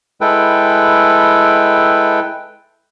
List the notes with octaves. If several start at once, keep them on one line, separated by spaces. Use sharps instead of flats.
G#3 E4 A4 B4 G5